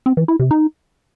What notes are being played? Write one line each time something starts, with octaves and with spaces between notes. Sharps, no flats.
C4
E3
E4
C3
D#4